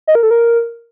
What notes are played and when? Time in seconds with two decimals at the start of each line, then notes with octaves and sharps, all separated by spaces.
0.07 D#5
0.15 A#4
0.23 A4
0.31 A#4